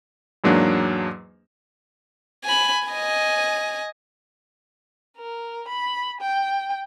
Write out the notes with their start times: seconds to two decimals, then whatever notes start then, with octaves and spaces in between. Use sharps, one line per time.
0.44 E2 G#2 F#3 A#3 D4
2.45 G#5 B5
2.89 D#5 G#5
5.18 A#4
5.68 B5
6.21 G5